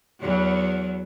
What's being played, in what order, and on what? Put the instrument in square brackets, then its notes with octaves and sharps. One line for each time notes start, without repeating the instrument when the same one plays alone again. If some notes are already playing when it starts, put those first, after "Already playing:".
[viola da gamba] E2 F#3